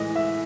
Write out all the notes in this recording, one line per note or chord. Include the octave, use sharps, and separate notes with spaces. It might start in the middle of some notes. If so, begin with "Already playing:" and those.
Already playing: A2 E3 G#3 D#5
E5